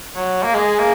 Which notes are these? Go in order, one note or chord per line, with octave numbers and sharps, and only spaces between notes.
F#3
A#3
G#3 G#4
A#3